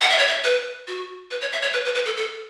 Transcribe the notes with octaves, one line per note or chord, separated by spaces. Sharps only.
F#5
E5
C#5
E5
B4
F#4
B4
C#5
E5
C#5
B4
B4
B4
A4
A4